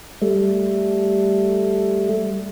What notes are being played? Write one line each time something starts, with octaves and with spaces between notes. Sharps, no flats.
G3 A3